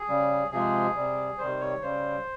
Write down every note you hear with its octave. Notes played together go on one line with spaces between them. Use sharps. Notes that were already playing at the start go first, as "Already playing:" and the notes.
Already playing: G#4
C#3 G3
C3 F3 G#3 G#4
C3 G3
C3 D#3 G3 C5
C#5
C#3 G3 C5